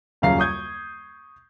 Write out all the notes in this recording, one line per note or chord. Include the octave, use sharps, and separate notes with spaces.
D#1 F#2 C#3 F5 A#5 C7
C#6 D#6 G6 G#6